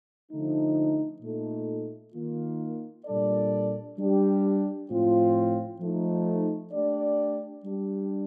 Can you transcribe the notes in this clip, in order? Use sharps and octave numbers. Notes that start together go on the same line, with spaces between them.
D3 F3 A3 D#4
A#2 A3 D#4 A4
D#3 A#3 F4
A#2 G3 D4 A4 D5
G3 D4 G4
A2 F3 C4 F4
F3 A3 D#4
A3 D4 G4 D5
G3 D4 G4